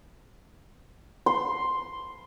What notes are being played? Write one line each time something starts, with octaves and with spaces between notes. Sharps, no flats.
C6